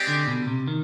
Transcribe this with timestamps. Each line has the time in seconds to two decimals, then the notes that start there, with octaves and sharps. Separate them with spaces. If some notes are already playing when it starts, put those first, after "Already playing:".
Already playing: G#3 C4 G4 D5
0.08 D3
0.27 B2
0.47 C3
0.68 D#3